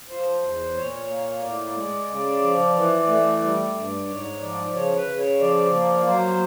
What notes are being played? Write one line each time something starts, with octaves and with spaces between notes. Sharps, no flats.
F3 C5
E2
A#2 C#5
A#3
A2 D5
G#3
C#3
F3
E3
A3
G3
G2
G#2 C#5
F3 D5
C#3 C#5
B4
C#3
C#5
F3 D5
A#3
F#3 C5